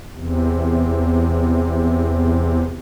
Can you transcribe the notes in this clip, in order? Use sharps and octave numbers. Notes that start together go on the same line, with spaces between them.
E2 C3